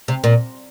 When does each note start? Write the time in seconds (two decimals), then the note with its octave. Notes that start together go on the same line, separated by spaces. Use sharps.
0.08 C3
0.24 A#2